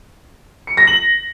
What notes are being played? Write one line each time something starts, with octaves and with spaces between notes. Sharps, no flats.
C#7
A#6
F#7